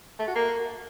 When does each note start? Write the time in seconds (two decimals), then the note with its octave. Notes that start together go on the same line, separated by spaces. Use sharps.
0.19 A3
0.27 F#4
0.35 A#3